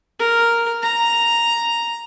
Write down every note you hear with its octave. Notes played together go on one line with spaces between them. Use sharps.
A#4
A#5